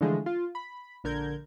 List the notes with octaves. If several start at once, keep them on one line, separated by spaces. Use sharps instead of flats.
D3 E3 F3 G#3 A3
F4
B5
A#1 D3 A#4 G6 G#6